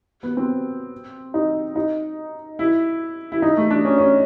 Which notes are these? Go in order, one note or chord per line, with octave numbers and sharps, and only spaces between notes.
B3
C4
D#4
D#4
E4
E4
D#4
A3
D4
C#4
C#4